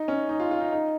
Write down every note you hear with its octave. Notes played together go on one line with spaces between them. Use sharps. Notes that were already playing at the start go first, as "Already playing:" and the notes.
Already playing: D#4
C#4
D#4
F4
F4
D#4
D#4